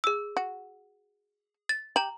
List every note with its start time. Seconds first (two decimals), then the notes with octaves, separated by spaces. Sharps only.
0.04 G#4 E6
0.37 F#4
1.69 A6
1.96 G4 A#5 F#7